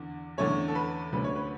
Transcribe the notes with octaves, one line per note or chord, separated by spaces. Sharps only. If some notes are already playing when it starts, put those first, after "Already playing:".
Already playing: E2 D3
E2 D3 A3 C#4 C#5
A4
B4
D2 D3 A3 C#4 B4
C#5
B4